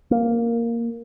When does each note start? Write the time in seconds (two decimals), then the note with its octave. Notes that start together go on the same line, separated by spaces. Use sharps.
0.11 A#3